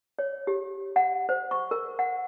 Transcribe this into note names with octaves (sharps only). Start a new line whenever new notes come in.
C#5
G4
F#5
C5
C#6
A#4
F#5